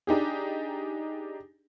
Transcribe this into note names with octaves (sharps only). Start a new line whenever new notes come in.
D4 D#4 G4 G#4